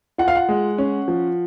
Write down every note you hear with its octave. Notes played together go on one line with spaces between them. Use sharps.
F4 F#5
F5
F#5
G#3
C#4
F3